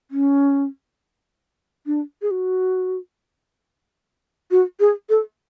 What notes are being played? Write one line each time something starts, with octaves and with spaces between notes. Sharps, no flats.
C#4
D4
G#4
F#4
F#4
G#4
A4